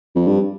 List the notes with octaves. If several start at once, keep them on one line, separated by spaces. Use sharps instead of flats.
F2
G2